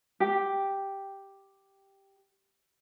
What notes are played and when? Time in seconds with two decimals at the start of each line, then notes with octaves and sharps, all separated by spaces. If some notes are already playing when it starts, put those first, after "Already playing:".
0.20 G4 G5